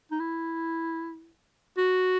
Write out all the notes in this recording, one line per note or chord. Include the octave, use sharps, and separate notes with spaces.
D#4
E4
F#4